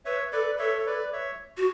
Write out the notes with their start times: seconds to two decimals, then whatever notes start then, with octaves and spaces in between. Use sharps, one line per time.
0.05 B4 C#5 E5
0.32 A4 B4 D5
0.59 A4 C#5 E5
0.78 C#5
0.86 B4 D5
1.12 C#5 E5
1.57 F#4